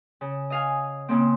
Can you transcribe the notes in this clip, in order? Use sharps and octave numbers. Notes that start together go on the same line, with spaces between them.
C#3
D#5 F5 G#5
A#2 C#3 A#3 C4